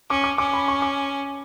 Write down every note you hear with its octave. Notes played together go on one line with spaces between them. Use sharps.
C#4 D6
D6
C#4 D6
B5
C#6
D6